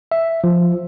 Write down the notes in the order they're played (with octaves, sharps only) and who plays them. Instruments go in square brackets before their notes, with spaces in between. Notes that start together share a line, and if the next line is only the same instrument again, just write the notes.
[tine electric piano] E5
F3